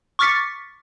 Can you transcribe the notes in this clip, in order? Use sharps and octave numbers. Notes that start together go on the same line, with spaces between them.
C#6 D6 F6 A6 B6 C#7